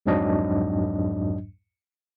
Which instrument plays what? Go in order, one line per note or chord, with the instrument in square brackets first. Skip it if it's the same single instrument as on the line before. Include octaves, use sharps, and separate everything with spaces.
[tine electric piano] C2 F2 G#2 F#3 D4 D#5